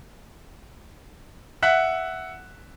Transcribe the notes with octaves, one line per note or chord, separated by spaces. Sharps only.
E5 F#5 F#6 B6